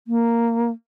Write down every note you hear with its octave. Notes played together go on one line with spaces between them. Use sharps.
A#3